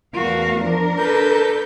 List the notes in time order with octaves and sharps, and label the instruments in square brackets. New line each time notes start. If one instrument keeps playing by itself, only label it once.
[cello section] E2 A3 F5 [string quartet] F#4 A#4
[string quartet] F3 [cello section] D4 A#4
[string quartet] A4 B4 G6